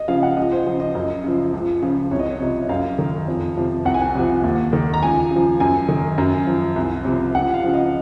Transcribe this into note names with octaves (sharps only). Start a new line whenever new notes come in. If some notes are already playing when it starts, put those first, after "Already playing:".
Already playing: D#5
C#3 F3 F5
F#5
C#2 D#5
C5
C#3 F3
D#5
F#2
C#3 F3
C#2
C#3 F3
C2 C#5
D#5
C#5
C3 F3 D#5
F#2 F5
D#3
F2
C3 F3
C2 F#5
G#5
F#5
C3 F3
D#2
D#3
A#5
C#2 G#5
C#3 F3
F#2 G#5
D#3
F#2
F3
C2
C3 F3
C#2 F#5
F5
C#3 F3
D#5